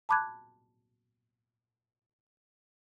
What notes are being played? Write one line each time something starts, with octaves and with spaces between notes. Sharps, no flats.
A5 B5 D6 F#6 G#6